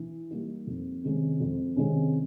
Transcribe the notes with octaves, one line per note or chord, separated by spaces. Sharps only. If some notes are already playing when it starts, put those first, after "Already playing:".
Already playing: E3
G3 A#3 D#4
F2
C3 D#3 G#3 C#4
F2
C3 D#3 G#3 C#4